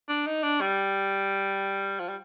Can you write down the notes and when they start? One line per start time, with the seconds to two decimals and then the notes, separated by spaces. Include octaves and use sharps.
0.09 D4
0.27 D#4
0.43 D4
0.61 G3
2.00 F3
2.09 G3